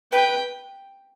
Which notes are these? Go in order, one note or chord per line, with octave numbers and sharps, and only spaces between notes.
B4 G5